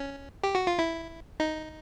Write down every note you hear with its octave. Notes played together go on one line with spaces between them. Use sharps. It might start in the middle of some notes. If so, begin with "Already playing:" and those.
Already playing: C#4
G4
F#4
F4
E4
D#4